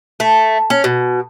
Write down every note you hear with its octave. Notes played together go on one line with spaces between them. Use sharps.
A3
C#4
B2